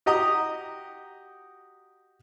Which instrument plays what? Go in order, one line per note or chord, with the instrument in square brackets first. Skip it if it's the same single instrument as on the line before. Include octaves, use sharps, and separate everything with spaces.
[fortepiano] F#4 G4 D#5 A#5 D#6